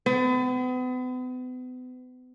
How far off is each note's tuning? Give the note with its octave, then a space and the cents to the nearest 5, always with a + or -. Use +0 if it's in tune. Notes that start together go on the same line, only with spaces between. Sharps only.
B3 +40